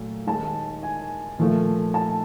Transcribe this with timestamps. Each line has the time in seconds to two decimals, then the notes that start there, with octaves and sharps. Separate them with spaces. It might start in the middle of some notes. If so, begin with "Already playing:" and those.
Already playing: A#2 F#3 A3
0.27 D#2 D#3 G#3 A5
0.83 G#5
1.39 A#2 F3 A3
1.94 A5